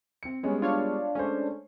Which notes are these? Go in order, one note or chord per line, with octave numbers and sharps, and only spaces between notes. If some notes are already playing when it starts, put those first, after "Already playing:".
C4 C#7
G3 G#3 B3 C#4
D4 F4 C#5 F5
G#3 A3 C#4 C5